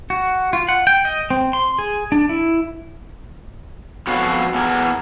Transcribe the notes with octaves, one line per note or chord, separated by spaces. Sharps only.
F#4
F4
F#5
G5
D#5
C4
C6
G#4
D4
E4
F2 B3 F#4 C#5 F5
E2 B3 G#4 A#4